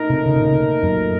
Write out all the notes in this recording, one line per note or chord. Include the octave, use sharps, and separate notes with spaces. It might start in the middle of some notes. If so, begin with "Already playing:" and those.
Already playing: A#2 A3 D#4 A#4
C3
C#3
C3
C#3
F#2